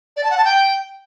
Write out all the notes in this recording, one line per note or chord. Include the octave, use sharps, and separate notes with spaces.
D5
A5
F#5
A5
G5